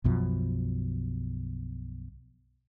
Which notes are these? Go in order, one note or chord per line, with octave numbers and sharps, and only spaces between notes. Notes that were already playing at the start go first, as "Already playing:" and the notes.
B1 F#2 B2 F3